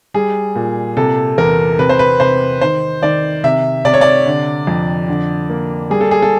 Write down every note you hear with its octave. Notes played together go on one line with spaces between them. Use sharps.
G3 G#4
A#2
C3 A4
E2 A#4
C3 B4
C5
B4
C3 C5
D#3 C5
D#3 D5
C3 E5
C3 D5
C#5
D5
D3
F2
D3
A#3
G3 G#4
A4
G#4
A4